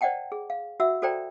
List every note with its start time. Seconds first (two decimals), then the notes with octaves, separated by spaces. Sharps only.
0.01 C5 D5 D#5 F#5 G5 A5
0.32 G#4
0.50 F5
0.80 F#4 E5 F#5 E6
1.02 F#4 A4 C5 D5 G5 A#5